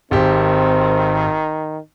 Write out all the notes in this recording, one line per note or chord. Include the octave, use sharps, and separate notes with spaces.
G#1 D#3 C4 G4